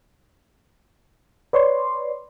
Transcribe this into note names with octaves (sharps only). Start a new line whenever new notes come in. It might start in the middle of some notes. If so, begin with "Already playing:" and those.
B4 C#5 D5 C6